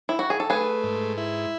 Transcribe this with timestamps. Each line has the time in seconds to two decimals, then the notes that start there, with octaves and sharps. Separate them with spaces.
0.09 E4
0.19 F#4
0.30 G#4
0.40 A4
0.50 A3 G#4 B4
0.83 G#2
1.17 E4